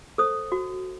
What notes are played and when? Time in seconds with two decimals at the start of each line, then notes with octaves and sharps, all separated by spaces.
0.18 A4 C5 D#6
0.52 F#4